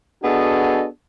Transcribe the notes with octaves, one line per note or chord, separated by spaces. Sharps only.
B3 D4 F#4 G#4 A4 D#5